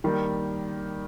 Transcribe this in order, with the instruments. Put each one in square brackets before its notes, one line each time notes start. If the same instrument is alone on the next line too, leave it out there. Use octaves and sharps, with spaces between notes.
[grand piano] D#3 G3 A#3